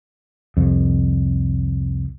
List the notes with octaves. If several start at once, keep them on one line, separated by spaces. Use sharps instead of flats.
C2 F2